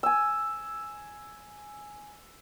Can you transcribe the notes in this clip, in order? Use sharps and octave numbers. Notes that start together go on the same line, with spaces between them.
G#5 E6